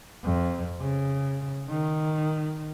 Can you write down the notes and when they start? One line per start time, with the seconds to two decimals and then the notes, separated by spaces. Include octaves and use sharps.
0.23 F2
0.80 C#3
1.69 D#3